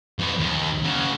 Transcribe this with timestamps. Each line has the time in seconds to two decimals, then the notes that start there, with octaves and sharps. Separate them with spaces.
0.19 F2 B3
0.40 D#2
0.84 C#3 F#4